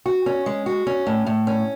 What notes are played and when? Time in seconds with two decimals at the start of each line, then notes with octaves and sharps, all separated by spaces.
0.06 F#4
0.26 C#4
0.46 G#3
0.66 F#4
0.87 C#4
1.07 A2
1.26 A2
1.47 C#4